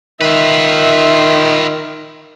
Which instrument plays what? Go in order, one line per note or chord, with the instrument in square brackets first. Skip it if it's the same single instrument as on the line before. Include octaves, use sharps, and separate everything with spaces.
[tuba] D#3 [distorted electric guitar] F4 B4 [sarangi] E5